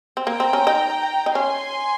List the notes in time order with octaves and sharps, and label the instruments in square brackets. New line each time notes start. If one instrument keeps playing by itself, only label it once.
[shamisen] C4
[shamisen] A#3 [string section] G5 A#5
[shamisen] C4
C#4
D#4
D#4
[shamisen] C#4 [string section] G#5 C6